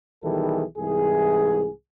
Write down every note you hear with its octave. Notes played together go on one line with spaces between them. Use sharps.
B1 D#3 E3 G3 G#4 A4
C2 G#2 E3 G#4